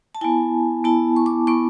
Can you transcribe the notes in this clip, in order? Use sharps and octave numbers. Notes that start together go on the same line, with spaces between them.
A5
B3 E4 G#5
B3 E4 A5
C#6
D6
B3 E4 C#6